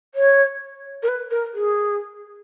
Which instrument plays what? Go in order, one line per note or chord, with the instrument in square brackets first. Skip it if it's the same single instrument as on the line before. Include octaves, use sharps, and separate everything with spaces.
[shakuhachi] C#5
A#4
B4
A#4
G#4